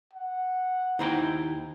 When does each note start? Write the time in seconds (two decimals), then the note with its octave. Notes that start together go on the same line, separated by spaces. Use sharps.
0.13 F#5
0.99 D#2 D#4 E4 C5 G5 A#5